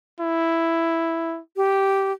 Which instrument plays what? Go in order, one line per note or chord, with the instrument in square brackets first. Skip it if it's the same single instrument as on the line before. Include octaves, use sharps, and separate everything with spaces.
[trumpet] E4
[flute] G4